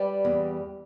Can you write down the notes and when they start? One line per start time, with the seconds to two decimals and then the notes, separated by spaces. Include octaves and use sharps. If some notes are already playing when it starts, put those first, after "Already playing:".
Already playing: G3 B4 D5
0.25 E2